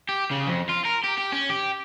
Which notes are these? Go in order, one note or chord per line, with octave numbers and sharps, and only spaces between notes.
G4
C#3
F2
F4
A#4
G4
G4
C#4
G4